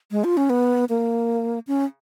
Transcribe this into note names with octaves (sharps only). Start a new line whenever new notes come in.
G#3
F4
C#4
B3
A#3
C#4